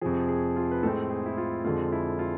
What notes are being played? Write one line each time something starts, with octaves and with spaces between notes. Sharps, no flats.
F2 C3 F3 G#4
G#4
F4
B4
A2 G#3 C4 A4
G#4
E4
F4
F2 D3 G#3 F4
E4
F4